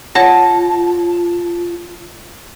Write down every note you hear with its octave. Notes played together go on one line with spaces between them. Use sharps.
F4 C#5 F#5 A5 A#6